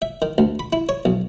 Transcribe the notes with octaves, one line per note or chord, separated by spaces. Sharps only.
E5
D#3
D2
B5
E4
C#5
B1